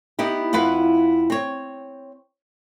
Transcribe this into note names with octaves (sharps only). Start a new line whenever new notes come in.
B3 D#4 E4 G4
F2 E4 F4 B4 F#5
C4 C#5